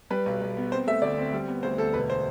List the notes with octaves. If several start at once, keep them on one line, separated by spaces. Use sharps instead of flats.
G3 B4
B1
B1
B3
C4 C5
A3 E5
D2 D5
C4
G3
B3
D2 C5
D2 A4
E1 B4
C5